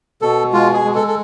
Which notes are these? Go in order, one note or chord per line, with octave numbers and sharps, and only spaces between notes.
B2 A4
G#3 F4
G#4
G#3
A4
A4